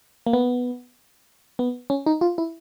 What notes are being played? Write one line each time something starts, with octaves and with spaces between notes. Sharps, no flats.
A#3
B3
B3
C#4
D#4
F4
E4